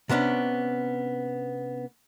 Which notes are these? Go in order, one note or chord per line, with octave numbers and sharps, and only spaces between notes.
C3 B3 C#4 D4